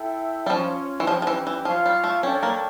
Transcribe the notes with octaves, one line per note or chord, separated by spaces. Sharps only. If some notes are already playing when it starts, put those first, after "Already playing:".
Already playing: E4 A4 E5 G5
G3
F3 C#4 F4 C#5 F5
E3
F3 G3 C#4 G4
F3
E3
E3
F3 F4 C#5 F5
G3
A3
C#4 D4 A4 C#5 G5
A#3